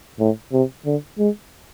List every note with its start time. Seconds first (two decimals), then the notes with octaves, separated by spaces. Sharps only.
0.20 A2
0.53 C3
0.85 D3
1.19 G#3